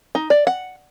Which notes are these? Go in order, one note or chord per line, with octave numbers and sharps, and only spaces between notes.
D#4
D5
F#5